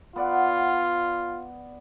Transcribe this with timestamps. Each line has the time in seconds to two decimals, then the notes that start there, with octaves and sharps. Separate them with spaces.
0.16 B3 F4 D5 F#5